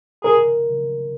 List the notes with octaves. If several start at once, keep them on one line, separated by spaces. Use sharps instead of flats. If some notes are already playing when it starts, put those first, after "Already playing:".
G#4 A#4